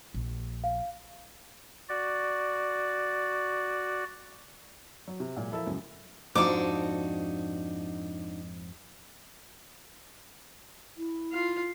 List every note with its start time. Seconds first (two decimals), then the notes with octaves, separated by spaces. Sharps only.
0.14 A#1
0.64 F5
1.89 F#4 D5
5.08 F#3
5.20 C3
5.37 A#2 F#3 G#3
5.51 F3 E4 A4 A#4 E5
5.67 C#2 F#2 C#3
6.35 F2 G#2 D4 D#4 F#4 D6
10.97 E4
11.33 F4 F5